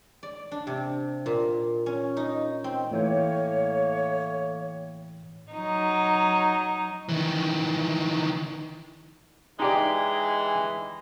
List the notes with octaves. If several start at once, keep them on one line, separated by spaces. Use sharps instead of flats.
D5
D4
C3
A#2
C#4
D#4
C4
A2 E3 A3 A#3 C#5 G5
F#3 D#4
D#3 E3
E3 G#3 D#4 G4 D5